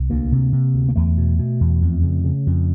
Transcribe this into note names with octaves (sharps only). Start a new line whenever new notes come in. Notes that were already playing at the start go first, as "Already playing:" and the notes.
Already playing: C2
D2 A#3
C3
C3
D2
A#3
E2 A3
B2
B2
E2
F2
C#3
C#3
F2